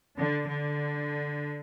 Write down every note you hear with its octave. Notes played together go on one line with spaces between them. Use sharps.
D3
D3